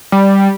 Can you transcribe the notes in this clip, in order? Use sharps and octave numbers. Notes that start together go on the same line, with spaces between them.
G3